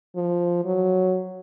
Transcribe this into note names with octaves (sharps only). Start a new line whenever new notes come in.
F3
F#3